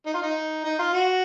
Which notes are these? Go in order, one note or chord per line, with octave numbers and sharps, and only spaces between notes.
D#4
F4
D#4
D#4
F4
F#4